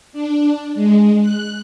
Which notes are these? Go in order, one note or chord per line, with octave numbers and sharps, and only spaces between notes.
D4
G#3
F#6